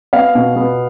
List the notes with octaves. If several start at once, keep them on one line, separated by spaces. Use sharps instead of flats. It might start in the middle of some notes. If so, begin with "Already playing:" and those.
B3 F5
B2
B3